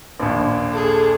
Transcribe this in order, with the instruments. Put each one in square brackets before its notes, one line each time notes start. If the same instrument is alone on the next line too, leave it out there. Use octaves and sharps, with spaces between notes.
[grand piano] A#1 D#2
[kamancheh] G#4 A4